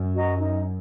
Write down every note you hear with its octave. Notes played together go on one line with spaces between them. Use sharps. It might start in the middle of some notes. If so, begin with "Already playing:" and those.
Already playing: F#2
F#4 D#5 A#5
D#4